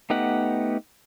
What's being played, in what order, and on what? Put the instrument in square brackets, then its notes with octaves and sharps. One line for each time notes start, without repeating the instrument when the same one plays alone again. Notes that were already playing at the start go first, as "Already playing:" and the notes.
[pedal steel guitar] A3 B3 D#4 G4 F#5